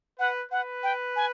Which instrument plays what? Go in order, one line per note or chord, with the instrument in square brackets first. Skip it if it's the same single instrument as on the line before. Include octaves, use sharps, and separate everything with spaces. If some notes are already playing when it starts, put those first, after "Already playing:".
[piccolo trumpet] B4 [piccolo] F#5
[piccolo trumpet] B4 [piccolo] F#5
[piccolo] G5
G#5